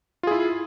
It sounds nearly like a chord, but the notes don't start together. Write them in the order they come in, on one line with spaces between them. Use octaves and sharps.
F4 G#4 E4